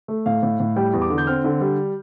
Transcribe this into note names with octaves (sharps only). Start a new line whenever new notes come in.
A3
A2 F5
A2
A2
G3 G5
E2
D6
D3
G6
C4 F6
D3
G3